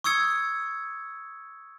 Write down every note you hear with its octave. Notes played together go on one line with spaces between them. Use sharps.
C#6 D#6 E6 G#6 C#7